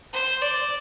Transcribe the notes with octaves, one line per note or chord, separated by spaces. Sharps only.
C5
D5